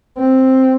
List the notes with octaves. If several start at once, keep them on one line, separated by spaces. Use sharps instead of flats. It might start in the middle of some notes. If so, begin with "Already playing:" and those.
C4